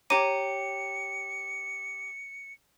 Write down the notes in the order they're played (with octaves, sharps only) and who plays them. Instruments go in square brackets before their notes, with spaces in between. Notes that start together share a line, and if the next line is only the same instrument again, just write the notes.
[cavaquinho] G4 A#5 [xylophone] C#5 D6 D#7 [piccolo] C#7